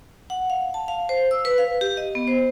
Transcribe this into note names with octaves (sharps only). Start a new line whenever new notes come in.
F#5
F5
A5
F5
C5
E6
B4
F5
G4
D#5
B3
C5